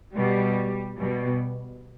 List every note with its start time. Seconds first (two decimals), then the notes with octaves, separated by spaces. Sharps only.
0.15 B2 G3
0.98 B2 G3